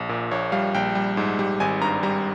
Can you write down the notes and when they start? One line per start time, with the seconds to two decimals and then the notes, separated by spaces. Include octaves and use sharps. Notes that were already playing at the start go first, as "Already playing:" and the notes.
Already playing: A#1
0.09 A#2
0.31 A#1 C#5
0.52 G3 F5
0.74 A#1 G5
0.95 G3
1.17 G#2
1.39 G3
1.60 G#1 G#5
1.81 G2 A#5
2.03 G3 A#5